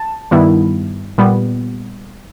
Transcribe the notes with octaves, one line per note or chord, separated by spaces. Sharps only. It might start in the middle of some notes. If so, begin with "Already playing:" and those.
Already playing: A5
G2 D#3 G3 B3 E4
A#2 G3 B3